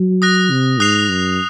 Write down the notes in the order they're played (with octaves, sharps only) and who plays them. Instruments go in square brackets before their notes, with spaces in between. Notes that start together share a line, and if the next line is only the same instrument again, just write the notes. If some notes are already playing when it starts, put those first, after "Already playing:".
Already playing: [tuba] F#3
[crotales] D#6 F#6 A#6
[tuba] C3
[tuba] G#2 [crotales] D#6 F#6 C7 F7
[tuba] F#2